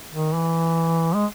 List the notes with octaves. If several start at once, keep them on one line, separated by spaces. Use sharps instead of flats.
D#3
E3
G#3